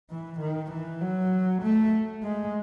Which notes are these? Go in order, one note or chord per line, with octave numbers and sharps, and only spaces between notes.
E3
D#3
E3
F#3
A3
G#3